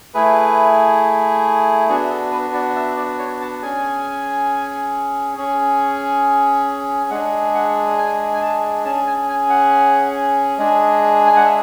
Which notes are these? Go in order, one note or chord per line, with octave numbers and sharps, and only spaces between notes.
A3 E4 G#4 B4
B3 D4 F#4 G#4
A4
B4
D5
E5
D5
C#5
A5
C#4 G#4 G#5
C#4 G#4
G#3 D4 G#4 F#5
F#5
G#5
G#5
A5
C#4 G#4 A5
G#5
G#5
F#5
G#3 D4 G#4
G#5
F#5
E5